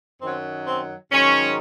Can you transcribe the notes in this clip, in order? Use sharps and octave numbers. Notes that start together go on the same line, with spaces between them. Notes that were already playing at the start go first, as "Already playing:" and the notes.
F#2 D#3 F#3 C4
C4
G#2 D#3 F#3 C#4